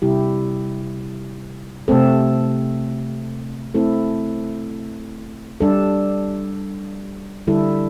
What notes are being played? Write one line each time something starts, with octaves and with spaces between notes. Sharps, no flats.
C3 G3 E4 G4
C3 A3 C4 A4
A3 C4 E4 A4
G3 D4 A4
D3 G3 E4 A4